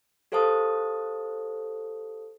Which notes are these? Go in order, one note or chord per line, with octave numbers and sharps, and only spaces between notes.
G4 A4 C5 F5 A5 D#6